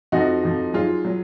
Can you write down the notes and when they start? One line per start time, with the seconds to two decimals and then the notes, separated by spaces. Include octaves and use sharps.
0.12 F2 F3 D#4 F#4
0.43 F2 F3
0.74 G#2 F#3 F4 G#4
1.05 F#3